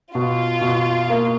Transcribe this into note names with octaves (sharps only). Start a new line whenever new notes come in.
B2 F4
B2
A#3